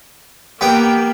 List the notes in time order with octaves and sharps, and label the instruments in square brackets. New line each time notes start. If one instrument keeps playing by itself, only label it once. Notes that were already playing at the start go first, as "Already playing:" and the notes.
[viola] A#3 [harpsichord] B3 G5 [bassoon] G4